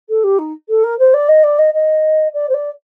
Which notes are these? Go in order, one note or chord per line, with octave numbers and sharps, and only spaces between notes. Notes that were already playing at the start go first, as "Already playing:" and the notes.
A4
G4
D#4
A4
A#4
C5
D5
D#5
D5
D#5
D#5
D5
C5
D5